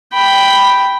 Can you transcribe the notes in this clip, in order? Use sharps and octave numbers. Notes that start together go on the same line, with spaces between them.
G5 B5